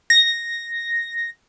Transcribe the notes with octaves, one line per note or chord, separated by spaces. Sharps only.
A#6